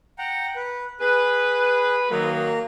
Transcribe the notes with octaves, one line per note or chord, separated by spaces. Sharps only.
F#5 G5 A#5
B4
G#4 B4
D#3 F#3 A#3 A#4